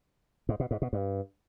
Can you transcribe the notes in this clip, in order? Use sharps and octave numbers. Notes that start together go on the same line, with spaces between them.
G#2
B2
G#2
B2
G2